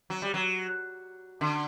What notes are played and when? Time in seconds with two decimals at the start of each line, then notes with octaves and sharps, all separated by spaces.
0.10 F#3
0.22 G3
0.34 F#3
1.41 D3